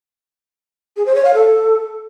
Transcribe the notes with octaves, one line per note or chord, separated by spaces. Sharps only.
G#4
C5
C#5
F5
A4